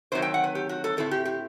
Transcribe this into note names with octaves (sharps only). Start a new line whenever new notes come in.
C3 D#3 F#3 A3 C4 C5
G5
F#5
B4
G4
F#4
A4
A2 F#3 C4 E4 A4
G4
G4